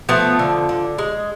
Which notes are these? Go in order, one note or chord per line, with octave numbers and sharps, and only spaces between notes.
F3 A3 B3
D3
D3
G#3